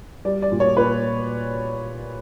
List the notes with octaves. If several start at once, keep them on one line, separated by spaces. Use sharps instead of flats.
G3 D5
D5
A#2
C#5
A#2 B4